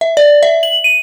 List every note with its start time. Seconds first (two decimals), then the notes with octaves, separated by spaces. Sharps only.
0.01 E5
0.17 D5
0.43 E5
0.63 F#7
0.84 D#7